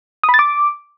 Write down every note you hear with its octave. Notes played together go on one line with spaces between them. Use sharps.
D#6
B5
A6
D6